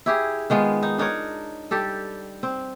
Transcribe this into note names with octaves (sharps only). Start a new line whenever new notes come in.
E4 G4 G#4
D#3 G#3 B3 F4
D#4
D4 D#4 A#4 C#5
G3 G4 A4
C4